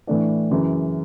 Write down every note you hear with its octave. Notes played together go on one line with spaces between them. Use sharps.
A2 E3 A3 D4
F#2 C#3 E3